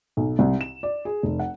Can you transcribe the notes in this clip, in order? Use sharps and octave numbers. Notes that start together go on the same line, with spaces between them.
B1
C2
E7
D5
G#4
F1
F#5